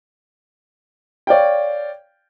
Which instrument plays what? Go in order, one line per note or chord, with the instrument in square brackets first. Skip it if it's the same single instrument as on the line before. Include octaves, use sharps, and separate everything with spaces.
[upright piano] C#5 D5 F5 G5